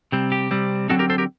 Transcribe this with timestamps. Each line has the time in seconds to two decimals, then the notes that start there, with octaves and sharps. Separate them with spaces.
0.12 C3 G3 C4
0.32 G4
0.51 C3 G3 C4
0.89 D3 F#3 C4 D#4 F#4 A4
0.99 G4 A#4
1.10 A4 C5
1.18 G4 A#4